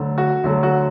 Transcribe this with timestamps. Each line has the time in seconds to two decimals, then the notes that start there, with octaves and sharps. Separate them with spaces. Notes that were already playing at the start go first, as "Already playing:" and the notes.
Already playing: D2 D3 F#3
0.18 F#4
0.44 D2 D3 F#3 A3
0.63 F#4